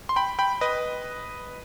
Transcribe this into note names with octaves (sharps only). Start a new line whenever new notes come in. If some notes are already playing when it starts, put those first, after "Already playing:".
C6
G5 B5
G5 B5
B4 D#5